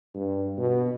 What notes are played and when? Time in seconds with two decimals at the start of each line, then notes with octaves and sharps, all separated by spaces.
0.15 G2
0.58 B2